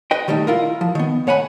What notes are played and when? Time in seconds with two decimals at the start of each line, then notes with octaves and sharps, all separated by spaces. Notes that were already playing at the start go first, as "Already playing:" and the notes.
0.11 B4 D#5 G5
0.28 D#3 G3 A3 D#4
0.47 E4 F4 A#4
0.81 F3
0.95 D#3 B3
1.27 A2 C#5 F#5 G#5 B5